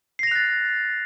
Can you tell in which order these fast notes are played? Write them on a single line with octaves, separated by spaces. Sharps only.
C7 A#6 F7 F#6 A6